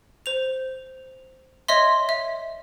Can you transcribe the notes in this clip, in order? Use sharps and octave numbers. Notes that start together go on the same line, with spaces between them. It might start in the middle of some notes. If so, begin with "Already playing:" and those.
C5 F7
C#5 D#5 E5 C6
E5